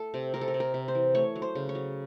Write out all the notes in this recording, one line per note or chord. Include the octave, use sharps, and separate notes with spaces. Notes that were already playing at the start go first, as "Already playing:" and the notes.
Already playing: A3 A4
C3
C3 A#4
A4
A#4
C3
A#4
C3
C5
E3
A3 C#5
F#3
C5
C#3
C#5
F#3